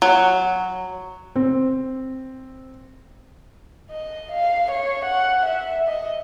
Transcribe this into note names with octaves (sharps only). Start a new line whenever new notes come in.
F#3
C4
D#5
F5
C#5
F#5
E5
D#5